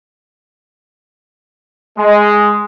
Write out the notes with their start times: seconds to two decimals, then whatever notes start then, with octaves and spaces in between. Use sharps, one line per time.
1.98 G#3